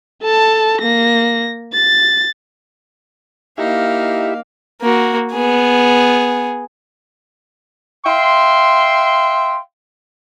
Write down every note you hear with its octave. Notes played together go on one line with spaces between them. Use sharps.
A4 A5
A#3 A#6
A6
A#3 D#4 E4 G4 E5 F5
A#3 F#4
B3 G#4
E5 F5 G5 C6